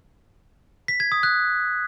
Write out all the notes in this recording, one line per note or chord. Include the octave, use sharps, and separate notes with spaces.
B6
G#6
D#6
F#6